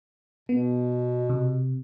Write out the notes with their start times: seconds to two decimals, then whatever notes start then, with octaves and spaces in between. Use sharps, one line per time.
0.49 B2 B3
1.29 C3